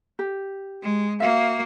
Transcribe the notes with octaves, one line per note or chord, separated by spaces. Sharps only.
G4
G#3
A#3 F#4 E5 F5